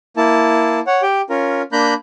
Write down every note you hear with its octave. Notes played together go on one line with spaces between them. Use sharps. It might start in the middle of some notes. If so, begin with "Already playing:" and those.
A#3 E4 A5
C#5 F#5
G4 G5
C#4 F4 A#4
A#3 D4 A#5 B5 F#6 G6